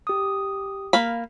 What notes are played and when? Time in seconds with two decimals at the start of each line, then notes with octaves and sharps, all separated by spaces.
0.07 G4 D#6
0.93 A#3 F5 B5